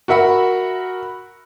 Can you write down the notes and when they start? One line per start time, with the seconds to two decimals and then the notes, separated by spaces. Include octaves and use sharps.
0.08 F#4 A#4 E5 F#5 B5